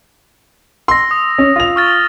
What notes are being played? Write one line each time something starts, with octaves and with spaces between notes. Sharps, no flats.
C6 E6 A#6
D#6
C#4
F4 F7
C#6 F6 A6